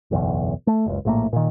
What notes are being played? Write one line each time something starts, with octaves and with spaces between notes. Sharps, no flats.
F#1 B1 E2
A3
F#1 C#2
A#1 A2 A#3
A#2 D#3